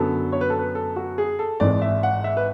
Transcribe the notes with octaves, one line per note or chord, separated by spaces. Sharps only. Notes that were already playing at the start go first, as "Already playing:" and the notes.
Already playing: F#2 D3 F#3 B3 A4
C#5
B4
A4
B4
A4
F#4
G#4
A4
G#1 G#2 E3 G#3 D5
E5
F#5
E5
B4